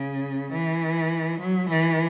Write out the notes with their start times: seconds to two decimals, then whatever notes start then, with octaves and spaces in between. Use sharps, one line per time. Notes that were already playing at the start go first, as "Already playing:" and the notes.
Already playing: C#3
0.53 E3
1.40 F#3
1.69 E3